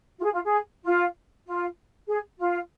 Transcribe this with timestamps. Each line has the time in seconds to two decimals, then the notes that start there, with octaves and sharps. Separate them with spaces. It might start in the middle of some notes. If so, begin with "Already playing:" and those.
0.18 F4
0.23 G#4
0.34 F4
0.44 G#4
0.84 F4
1.46 F4
2.07 G#4
2.39 F4